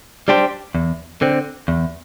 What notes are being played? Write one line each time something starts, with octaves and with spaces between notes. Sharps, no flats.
G3 D4 G4 C5
E2
D3 C4
E2